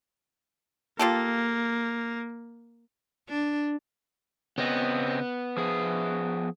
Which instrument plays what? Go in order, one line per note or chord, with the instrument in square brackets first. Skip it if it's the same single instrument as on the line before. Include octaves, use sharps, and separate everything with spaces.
[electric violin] A#3 [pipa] F4 G4 A4
[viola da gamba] D4
[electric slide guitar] C#3 C4 D#5 [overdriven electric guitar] B3
[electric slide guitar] F3 G#4